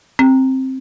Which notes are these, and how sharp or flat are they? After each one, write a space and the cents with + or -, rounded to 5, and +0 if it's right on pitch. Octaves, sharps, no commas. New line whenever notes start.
C4 +10